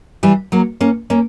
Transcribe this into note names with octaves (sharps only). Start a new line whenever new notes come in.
E3 G3
F#3 A#3
A#3 C#4
A#3 C#4